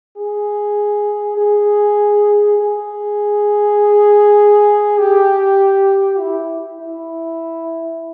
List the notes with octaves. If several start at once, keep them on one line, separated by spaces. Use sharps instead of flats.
G#4
G#4
G#4
G4
E4
E4